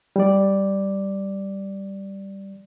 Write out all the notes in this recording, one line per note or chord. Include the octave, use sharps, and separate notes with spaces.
G3 D5